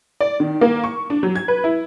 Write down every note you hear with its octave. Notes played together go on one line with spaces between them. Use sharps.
D5
D#3
A#3
C#6
D4
F#3
G#6
B4
E4